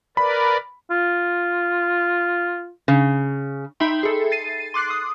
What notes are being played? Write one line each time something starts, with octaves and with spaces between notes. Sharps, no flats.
A#4 B4 D5 B5
F4
C#3
D#4 E5 G5 B5 C6
G#4 A4
A6 C7 D#7
C6 D6 F#6 C7
D#6